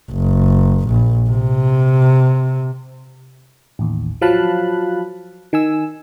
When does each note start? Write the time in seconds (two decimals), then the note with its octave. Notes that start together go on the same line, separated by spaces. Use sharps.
0.12 F#1
0.87 A#1
1.30 C3
3.79 A1 D#2
4.21 F3 F#3 F5 A5 B5 F#6
5.53 D#3 G#5 E6